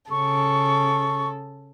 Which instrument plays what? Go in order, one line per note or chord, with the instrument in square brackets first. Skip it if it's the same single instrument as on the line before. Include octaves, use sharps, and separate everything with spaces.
[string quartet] C#3 A4 [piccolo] C#6